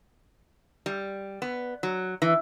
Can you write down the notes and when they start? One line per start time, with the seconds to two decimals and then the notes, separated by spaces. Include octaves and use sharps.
0.86 G3
1.42 B3
1.83 F#3
2.22 E3